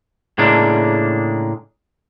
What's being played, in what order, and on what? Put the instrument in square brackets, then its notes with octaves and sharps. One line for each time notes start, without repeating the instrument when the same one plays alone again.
[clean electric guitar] A2 C#3 G#3 A#3 D4